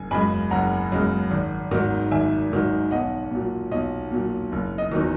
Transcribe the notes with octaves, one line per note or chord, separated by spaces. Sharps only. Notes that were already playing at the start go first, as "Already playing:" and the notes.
Already playing: F#1 G#5
F#2 C#3 G#3 G#5 B5
F#1 F#5 A#5
F#2 C#3 G#3
G#1
G#2 D#3 F#3
G#1 E5 G#5
G#2 D#3 F#3
B1 D#5 F#5
A#2 F#3
B1 D#5
A#2 F#3
F#1
D#5
E2 D#3 F#3